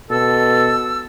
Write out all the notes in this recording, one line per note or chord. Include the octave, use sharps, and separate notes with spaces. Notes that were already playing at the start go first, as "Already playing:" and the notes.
B2 A4 E6